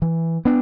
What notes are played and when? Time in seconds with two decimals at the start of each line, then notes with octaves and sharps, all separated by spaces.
0.02 E3
0.45 B3 D4